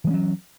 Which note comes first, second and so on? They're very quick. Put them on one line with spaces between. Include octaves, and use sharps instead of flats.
E3 G#3 C#4 F#3